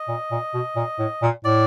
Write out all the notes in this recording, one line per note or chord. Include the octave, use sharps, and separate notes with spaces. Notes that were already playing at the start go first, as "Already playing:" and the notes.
Already playing: D#5
A#2
A#2
B2
A#2
A2
A#2
A2 D5